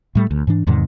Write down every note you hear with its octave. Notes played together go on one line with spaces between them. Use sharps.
A2 G3 A3
D2
G#2 E3 D4
E2 G#2 C3 D#3